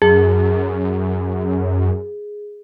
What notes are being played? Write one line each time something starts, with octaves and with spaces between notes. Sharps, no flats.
F#2 G#4